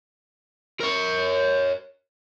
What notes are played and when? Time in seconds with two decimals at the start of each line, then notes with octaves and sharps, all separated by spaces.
0.81 A#4 C#5